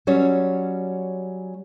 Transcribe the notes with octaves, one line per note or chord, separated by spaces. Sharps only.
F#3 G3 C#4 C#5